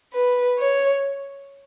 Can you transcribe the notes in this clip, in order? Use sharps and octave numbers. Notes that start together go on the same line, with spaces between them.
B4
C#5